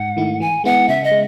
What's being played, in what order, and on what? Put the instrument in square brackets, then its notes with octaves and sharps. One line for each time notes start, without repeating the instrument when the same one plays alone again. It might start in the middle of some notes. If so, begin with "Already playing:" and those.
Already playing: [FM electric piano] G#2 [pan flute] F#5
[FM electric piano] D#3 A3 E4
[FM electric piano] E3 [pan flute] G#5
[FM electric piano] G#3 B3 E4 [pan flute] F#5
[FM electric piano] C#3 [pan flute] E5
[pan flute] D#5
[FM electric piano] G#3